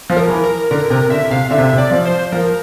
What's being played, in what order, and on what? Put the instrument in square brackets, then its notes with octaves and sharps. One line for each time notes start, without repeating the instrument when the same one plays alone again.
[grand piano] F3
[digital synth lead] A#4
[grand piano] E3
[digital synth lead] A#4
[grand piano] D3 [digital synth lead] A#4
[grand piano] C3 [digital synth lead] A#4
[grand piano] D3 [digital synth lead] E5
[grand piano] C3 [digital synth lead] F5
[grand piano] D3 [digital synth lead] E5
[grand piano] C3
C3
[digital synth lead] D5
[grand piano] F3
[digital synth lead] C5
[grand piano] F3 [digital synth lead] A#4